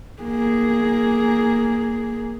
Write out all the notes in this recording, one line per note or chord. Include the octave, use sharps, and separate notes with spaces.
A#3 G#4